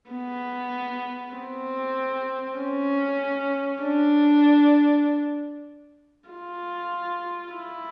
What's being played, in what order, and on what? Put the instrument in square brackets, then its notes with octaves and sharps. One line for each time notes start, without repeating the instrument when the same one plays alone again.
[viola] B3
C4
C#4
D4
F4
E4